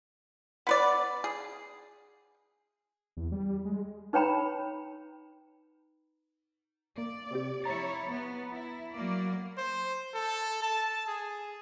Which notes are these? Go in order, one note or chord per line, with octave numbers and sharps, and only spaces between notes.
B3 B4 D5
G#4
E2
G3
G#3
D#4 B4 C#5 G5 A#5 B5
A#3 D5
C3 C4 G4
F3 E4 C#5 A#5 A6
B3
E4
F#3 A#3 D5
C5
A4
A5
G#4